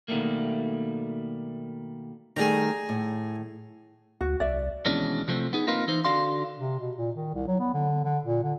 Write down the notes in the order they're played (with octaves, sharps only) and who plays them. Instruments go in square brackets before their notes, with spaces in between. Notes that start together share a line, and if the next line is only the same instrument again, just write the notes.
[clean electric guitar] B2 D#3 F#3 G3 A3 A#3
[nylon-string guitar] D#3 G3 A3 [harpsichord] G#4 A#5
[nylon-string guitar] A2
[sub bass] D2 [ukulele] F#4
[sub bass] C2 [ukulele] D5 E5
[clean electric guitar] D#2 B2 E3 G#3 C#4 D4
C3 F3 A3 C4
B3 D#4 G#4
A#3 C4 D#4 F4 A#4 B4
E3 D#4 C5
D3 F#4 D5 F5 C6
[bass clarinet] C3
B2
A#2
D#3
C2
F#3
B3
D3
D3
A#2
D3